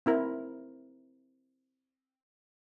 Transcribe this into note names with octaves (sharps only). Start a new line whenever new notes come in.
C4 E4 A#4